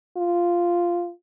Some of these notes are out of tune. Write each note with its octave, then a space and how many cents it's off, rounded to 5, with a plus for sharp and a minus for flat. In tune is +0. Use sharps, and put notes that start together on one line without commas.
F4 -5